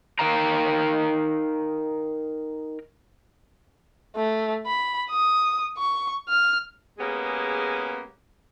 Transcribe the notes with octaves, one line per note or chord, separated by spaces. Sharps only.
D#4 A#4 F5 G5 A#5
A3
B5
D#6
C#6
F6
G#3 A#3 B3 C#4 G4 G#4